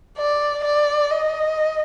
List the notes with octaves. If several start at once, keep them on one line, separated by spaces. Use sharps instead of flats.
D5
D5
D#5